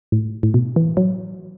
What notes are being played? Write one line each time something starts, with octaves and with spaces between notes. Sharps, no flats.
A2
A2
B2
E3
F#3